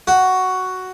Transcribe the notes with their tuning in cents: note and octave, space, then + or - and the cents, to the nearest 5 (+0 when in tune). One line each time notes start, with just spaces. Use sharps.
F#4 +5